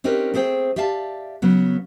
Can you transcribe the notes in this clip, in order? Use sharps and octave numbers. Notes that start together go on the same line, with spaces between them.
C4 C#4 D#4 G4 A#4 B4
A3 C4 G#4 C5 G5
G4 D5 E5 F5 A5
C#3 F#3 B3